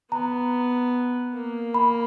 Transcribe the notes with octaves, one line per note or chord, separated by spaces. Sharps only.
B3 A#5
A#3
B5